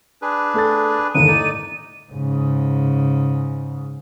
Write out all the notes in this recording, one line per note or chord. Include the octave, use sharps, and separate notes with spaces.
D4 G#4 B4
A3 A4 A6
G1 D#2 D3 D#7
A2 D#4 D5
G#2 C#3